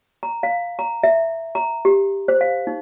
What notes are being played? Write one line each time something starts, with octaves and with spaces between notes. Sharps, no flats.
A#5
F5
A#5
E5
A#5
G4
C5
F5
D#4